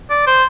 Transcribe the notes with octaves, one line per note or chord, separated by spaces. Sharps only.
D5
C5